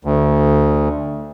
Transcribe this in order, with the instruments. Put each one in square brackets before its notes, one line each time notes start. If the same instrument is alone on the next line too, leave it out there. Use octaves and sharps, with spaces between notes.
[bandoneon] D2